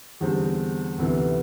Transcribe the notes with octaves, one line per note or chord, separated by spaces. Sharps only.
E2 D3 G3 C4
D2 C3 E3 B3